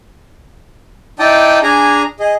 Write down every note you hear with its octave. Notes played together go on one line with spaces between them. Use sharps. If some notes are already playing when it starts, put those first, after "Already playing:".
D#4 E4 D5 G5 A5 D#6
D4 G#4 G#5 A#5
G#4 D#5